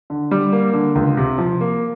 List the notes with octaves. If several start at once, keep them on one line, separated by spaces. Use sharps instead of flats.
D3
G3
A#3
D3
C#2
C3
F3
A#3